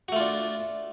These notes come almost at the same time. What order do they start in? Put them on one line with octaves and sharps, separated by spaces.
F#4 A3 F4 D4